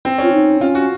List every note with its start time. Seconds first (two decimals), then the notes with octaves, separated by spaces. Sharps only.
0.05 C4
0.18 C#4 F4
0.32 D#4
0.61 C#4 F4
0.75 F#4